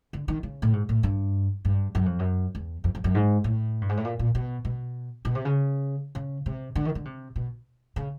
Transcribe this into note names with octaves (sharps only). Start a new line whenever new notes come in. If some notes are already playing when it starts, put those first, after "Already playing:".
D3
D#3
C#3
A2
G#2
A2
G2
G2
F#2
F2
F#2
E2
F2
F2
F#2
G#2
A2
G2
G#2
A2
A#2
A#2
B2
B2
B2
C3
C#3
C#3
C3
D3
D#3
D3
C3
B2
C#3